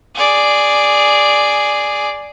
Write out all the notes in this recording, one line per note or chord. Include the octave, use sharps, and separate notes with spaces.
G#4 D5